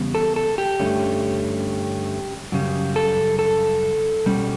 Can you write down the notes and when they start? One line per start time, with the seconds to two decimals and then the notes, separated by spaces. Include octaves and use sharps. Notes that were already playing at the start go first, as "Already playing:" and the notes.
Already playing: E2 C#3 G3 B3
0.15 A4
0.36 A4
0.58 G4
0.79 G2 D3 A3 C#4
2.52 F#2 C#3 G3
2.96 A4
3.39 A4
4.26 B2 G3 C#4